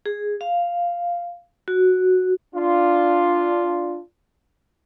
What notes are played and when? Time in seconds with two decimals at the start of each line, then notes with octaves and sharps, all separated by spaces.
0.06 G#4
0.41 F5
1.68 F#4
2.55 D4 F4